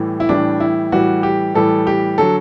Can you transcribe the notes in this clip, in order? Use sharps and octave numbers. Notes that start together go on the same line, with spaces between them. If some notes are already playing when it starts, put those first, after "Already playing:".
Already playing: A2 E3 G3
E4
A2 E3 G3 D4
E4
A2 E3 G3 F#4
G4
A2 E3 G3 A4
G4
D3 F#3 A4